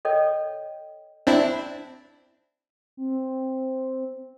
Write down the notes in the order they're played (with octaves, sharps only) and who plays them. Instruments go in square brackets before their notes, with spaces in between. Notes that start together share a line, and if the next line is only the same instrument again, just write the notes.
[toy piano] A4 C#5 D#5 G5
[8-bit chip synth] C4 D4 E4
[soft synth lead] C4